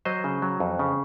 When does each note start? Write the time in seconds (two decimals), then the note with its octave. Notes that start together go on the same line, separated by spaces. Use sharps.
0.05 F#3 C5 D#5
0.24 C#3
0.42 F#3
0.60 F2
0.79 C#3